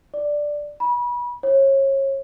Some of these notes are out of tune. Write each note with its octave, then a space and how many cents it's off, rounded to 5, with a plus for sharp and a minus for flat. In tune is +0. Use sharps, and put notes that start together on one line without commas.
D5 +5
B5 -30
C#5 -30